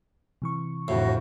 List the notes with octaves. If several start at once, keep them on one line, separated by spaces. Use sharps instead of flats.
C3 E3 C#6
G1 F2 A2 F#4 A5